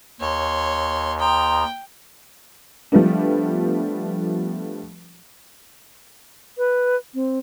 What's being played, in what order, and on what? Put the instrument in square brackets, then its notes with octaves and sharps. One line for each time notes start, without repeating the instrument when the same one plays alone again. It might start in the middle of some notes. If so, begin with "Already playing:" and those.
[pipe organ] D#2 [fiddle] C#5 C6
[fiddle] G5 [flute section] A#5 C6 D#6
[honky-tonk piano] F3 G3 A3 B3 D4
[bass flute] B4
C4